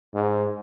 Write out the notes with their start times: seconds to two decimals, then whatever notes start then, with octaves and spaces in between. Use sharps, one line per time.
0.14 G#2